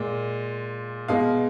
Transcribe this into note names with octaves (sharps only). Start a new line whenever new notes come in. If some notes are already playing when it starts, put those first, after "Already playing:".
Already playing: A#2 G#3
B2 G#3 F5